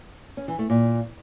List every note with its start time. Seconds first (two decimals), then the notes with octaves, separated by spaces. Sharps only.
0.37 C#4
0.48 E3
0.59 A3
0.70 A#2